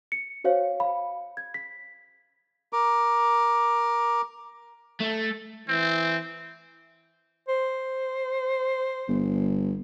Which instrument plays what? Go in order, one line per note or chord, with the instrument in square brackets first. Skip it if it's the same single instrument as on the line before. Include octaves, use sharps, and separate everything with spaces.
[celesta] C#7
F#4 C5 C#5 F5
F5 B5
G#6
B6
[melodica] A#4 D6
[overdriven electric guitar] A3
[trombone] E3 [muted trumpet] C4
[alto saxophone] C5
[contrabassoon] G1